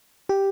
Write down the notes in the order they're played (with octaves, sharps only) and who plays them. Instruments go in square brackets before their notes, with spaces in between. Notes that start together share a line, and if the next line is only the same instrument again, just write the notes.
[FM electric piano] G4